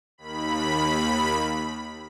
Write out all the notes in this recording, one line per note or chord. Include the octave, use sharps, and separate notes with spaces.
D#2 B5